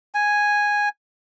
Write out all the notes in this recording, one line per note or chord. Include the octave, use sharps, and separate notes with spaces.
G#5